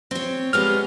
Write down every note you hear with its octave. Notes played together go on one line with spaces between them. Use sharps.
C4 C#5
G3 G#3 B3 F6